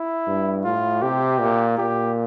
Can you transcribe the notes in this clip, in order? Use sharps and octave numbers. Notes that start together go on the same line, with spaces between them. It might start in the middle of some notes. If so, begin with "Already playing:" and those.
Already playing: E4
G2
A2 F4
C3 G4
A#2
A#2 G4